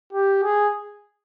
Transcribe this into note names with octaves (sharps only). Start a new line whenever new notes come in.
G4
G#4